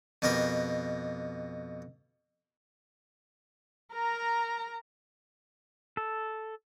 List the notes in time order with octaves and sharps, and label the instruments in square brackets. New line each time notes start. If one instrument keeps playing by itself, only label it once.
[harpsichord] F2 B2 G4 A#4 B5
[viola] A#4 A#5
[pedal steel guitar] A4